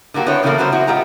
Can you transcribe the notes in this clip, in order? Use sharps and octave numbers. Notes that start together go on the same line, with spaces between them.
D3 F#3 A#3 F#4 G4
B3 C4 D4 E4 C#5
A2 C#3 E3 F#3 A3 A#3
F#3 G3 B3 C#4 F#4 C5
C4 E4 F#4
A2 G#3 F4 G4 F#5 A#5